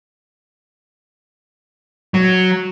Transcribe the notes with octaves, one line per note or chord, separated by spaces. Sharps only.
F#3